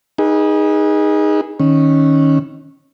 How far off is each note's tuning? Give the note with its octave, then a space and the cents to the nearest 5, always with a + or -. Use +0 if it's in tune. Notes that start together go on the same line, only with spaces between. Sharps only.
D#4 +0 G#4 -20 B4 -45
D#3 +0 C#4 -10